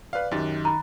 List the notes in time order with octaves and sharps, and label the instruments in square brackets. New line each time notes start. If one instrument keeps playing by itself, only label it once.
[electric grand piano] B4 F5 [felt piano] D5 F#6
[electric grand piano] F#2 G4 A6 [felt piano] D#3
[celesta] A#5 B5